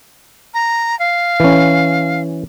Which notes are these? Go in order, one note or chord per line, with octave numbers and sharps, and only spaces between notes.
A#5
F5
E3 C#4